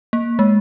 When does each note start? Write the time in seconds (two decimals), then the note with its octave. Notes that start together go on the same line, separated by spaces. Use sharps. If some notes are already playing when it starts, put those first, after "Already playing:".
0.13 A#3
0.39 G#3